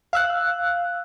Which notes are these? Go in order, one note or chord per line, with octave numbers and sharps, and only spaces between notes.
F5 E6 F#6